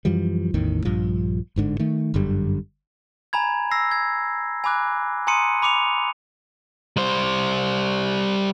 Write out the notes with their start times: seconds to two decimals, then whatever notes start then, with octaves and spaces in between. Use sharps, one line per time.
0.05 F#2 E3 F3 G3
0.54 A1 E2 A2 D#3
0.85 A#1 G2 F3
1.56 G1 G#2 D3
1.79 D#3 A3
2.14 G1 F#2 D3 G3
3.33 G#5 A#5 B5 G#6
3.71 E6 A#6 C7
3.91 G#6
4.64 G#5 B5 D6 F#6
5.27 G#5 A#5 C6 D#6 C#7 D#7
5.62 B5 D6 C#7 F7
6.97 G3 C5